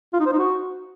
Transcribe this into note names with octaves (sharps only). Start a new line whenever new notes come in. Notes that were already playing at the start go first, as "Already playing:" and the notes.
F4
D#4
C5
D#4
F#4